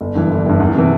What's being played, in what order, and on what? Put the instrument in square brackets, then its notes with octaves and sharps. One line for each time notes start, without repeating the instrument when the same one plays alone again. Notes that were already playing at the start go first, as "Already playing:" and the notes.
[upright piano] G1
G2 E3
G1
G2 E3
E2
C3 E3